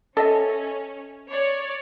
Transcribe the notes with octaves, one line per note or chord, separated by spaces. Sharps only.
C#4 A4 D#5 E5
C#5 D5